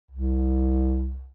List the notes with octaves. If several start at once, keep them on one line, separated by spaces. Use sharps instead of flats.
C2